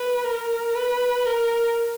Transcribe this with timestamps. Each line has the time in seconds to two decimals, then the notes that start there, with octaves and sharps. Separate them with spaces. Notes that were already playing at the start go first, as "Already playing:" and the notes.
Already playing: B4
0.24 A#4
0.74 B4
1.25 A#4